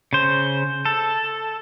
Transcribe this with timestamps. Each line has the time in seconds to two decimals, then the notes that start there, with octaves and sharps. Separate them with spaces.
0.13 C#3 C5
0.85 A4